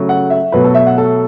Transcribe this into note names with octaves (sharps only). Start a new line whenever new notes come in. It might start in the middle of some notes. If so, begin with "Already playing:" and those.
Already playing: C#3 F#3 A3
F#5
E5
B2 F#3 A3 B4
A4
E5
F#5
A4